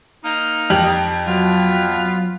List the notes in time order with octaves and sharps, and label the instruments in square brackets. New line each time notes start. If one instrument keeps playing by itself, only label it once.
[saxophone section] A#3 D#4
[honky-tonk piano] F2 G4 F#7
[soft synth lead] F#3 [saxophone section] B3 F4